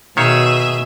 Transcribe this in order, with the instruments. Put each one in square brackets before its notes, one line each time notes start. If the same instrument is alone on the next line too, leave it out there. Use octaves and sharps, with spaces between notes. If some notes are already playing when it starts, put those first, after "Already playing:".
[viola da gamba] B2 [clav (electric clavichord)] D#3 C#5 F5 [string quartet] G#4 E5